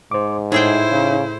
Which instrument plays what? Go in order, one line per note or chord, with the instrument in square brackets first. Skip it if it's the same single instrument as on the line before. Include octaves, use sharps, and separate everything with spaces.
[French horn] G#2 [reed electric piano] C5 D6
[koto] A2 G#4 G5 [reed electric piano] D#4 E5 [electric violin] E4 C5
[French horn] C#3